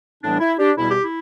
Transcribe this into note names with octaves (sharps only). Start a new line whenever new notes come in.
A2 E3 G3 B3 D4
E4
D4 G4
E2 B2 G3 B3 E4
G4
E4